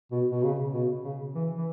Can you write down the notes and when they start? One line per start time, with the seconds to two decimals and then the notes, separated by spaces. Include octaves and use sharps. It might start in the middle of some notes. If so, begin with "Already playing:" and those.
0.12 B2
0.31 B2
0.43 C#3
0.73 B2
1.04 C#3
1.35 E3
1.58 E3